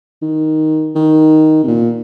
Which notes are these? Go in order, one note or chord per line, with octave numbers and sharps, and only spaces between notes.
D#3
D#3
C3
A#2